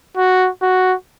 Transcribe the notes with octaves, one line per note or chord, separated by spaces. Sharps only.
F#4
F#4